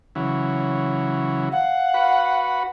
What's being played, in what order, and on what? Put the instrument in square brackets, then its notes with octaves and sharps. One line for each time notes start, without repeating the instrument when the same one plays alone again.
[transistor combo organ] C#3 E3 F#3
[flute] F5 [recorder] F#5
[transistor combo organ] F#4 B4